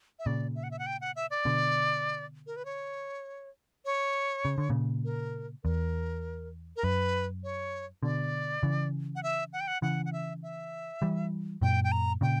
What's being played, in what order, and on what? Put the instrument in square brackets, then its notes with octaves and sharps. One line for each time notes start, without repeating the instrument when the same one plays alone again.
[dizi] E5
[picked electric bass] A#2 C#3 [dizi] D5
[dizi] E5
F#5
E5
F#5
G5
F#5
E5
D5
[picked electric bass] B2 D3
[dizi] A#4
B4
C#5
C#5
[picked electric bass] C#3
D3
A#2 C#3
[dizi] A#4
[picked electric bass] E2 [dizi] A#4
[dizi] A#4
[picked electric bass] F#2 [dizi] B4
[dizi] C#5
[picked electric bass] B2 D3 [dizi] D5
[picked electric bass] C#3 E3
[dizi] F#5
E5
F#5
G5
F#5
[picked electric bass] C#3 E3 [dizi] F#5
[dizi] F#5
E5
E5
[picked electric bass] E3 G3
[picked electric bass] F#2 A#2 [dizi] G5
[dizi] G5
A#5
[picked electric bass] A#2 C#3 [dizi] G5